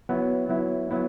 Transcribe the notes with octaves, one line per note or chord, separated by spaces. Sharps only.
F#3 B3 E4
F#3 B3 E4
F#3 B3 E4